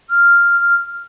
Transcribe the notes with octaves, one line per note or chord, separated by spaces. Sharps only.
F6